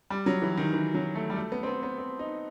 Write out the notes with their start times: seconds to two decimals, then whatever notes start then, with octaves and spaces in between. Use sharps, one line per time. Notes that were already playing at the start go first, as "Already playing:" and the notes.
0.10 G3
0.26 F#3
0.42 E3
0.57 D#3
0.73 E3
0.94 F#3
1.15 A3
1.30 G3
1.36 A3
1.52 B3
1.63 C4
1.67 B3
1.83 B3
1.98 C4
2.19 D#4